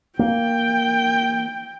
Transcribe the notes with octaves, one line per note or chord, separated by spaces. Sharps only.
A#3 G5